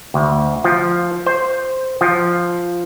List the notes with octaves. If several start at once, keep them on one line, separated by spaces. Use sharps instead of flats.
D2
F3
C5
F3